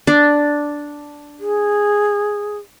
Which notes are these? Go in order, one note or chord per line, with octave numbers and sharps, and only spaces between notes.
D4
G#4